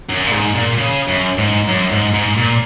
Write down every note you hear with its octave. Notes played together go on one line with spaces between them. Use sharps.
F#2
A#2
G#2
A#2
C#3
F#2
G#2
F#2
G#2
G#2
A#2